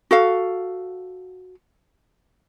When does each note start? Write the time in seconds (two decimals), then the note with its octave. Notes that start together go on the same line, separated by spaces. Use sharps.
0.11 F#4 A4 F5